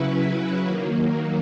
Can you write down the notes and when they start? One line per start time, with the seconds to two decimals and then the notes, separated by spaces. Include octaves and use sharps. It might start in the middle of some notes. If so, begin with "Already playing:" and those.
Already playing: C#3 F#3 C#4 E4 B4
0.65 D#3 F#3 A#3